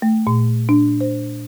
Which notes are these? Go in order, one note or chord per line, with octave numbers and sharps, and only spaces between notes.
A3
A#2
D4
C5